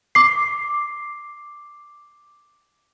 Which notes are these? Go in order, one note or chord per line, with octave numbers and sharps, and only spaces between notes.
D6 C7